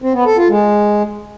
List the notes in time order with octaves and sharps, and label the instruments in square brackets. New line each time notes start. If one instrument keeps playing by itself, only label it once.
[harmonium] C4
B3
A4
F4
G#3